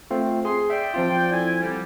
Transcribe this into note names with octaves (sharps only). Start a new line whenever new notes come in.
A3 C4 F4
G#4 C6
D5 E5 G5
F3 C4 F4
E4 A4 G#5
D3 G3